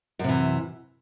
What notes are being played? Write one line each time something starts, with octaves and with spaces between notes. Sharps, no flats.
F#2 C3 E3